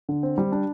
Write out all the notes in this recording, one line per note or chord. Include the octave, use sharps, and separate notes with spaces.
D3
C4
G3
D4